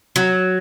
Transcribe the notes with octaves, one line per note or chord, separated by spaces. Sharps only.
F#3